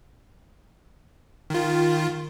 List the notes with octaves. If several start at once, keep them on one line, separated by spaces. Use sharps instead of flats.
D#3 F4